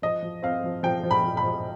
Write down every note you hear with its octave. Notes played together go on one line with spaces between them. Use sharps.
F3 D#5
F3
C4 F5
F3
F3 G5
F3
B5
F3
B5
F3